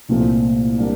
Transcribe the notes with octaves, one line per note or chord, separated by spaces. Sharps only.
C2 A#2 F3 A3
G3 A#3 D4